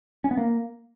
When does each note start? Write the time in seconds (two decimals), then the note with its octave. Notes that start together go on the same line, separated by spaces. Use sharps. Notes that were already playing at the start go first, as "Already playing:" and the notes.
0.24 C#4
0.31 B3
0.37 A#3